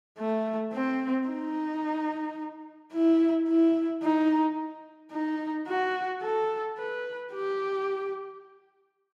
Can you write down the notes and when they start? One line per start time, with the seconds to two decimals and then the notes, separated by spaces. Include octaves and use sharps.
0.18 A3
0.73 C4
1.27 D#4
2.93 E4
3.48 E4
4.03 D#4
5.12 D#4
5.68 F#4
6.22 A4
6.78 B4
7.33 G4